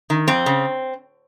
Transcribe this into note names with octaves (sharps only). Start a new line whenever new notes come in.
D#3
F2 C4
C#3